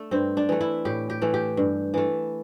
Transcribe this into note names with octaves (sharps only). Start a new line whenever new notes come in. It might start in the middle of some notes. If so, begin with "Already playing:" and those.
Already playing: A3 D4
G2 C4
D4
E3 A3
E4
A2 G4
G4
E3 A3
G4
G2
E3 A3